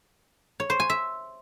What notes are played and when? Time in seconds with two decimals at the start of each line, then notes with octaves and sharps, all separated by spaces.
0.60 C#5
0.70 C5
0.80 G#5
0.90 E5